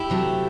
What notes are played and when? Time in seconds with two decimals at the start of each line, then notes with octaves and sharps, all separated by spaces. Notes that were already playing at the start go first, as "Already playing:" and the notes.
Already playing: E4 G4
0.10 C3 F#3 A3